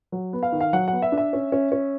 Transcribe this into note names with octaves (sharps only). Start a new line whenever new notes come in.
F#3
B3
F5
D#3
F5
F#3 F#5
F#5
B3
E5
D4
E5
C#4
C#4
C#4